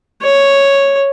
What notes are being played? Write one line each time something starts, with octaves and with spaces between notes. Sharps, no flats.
C#5